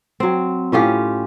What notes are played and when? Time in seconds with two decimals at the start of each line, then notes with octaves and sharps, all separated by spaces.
0.20 F#3 C4
0.72 A2 C#4 F4 G4